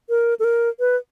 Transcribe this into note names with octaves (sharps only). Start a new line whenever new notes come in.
A#4
A4
A#4
B4